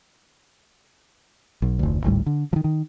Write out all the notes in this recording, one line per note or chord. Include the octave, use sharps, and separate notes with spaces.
B1
F1 D2
G#1 D2 A2 G3
D3
D#3 F3
D#3